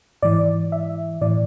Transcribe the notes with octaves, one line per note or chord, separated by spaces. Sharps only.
G#2 E3 D5
E5
A2 E3 D5